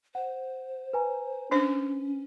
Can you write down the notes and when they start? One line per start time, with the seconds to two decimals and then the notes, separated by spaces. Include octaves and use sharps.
0.15 C5 F#5
0.93 B4 G#5 A#5
1.51 C#4 D4 C5